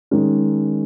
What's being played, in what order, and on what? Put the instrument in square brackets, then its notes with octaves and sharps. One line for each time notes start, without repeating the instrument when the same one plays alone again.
[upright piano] D#3 G#3 C#4